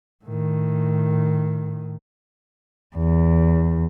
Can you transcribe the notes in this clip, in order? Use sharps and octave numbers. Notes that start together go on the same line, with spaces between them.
A2 D#3
E2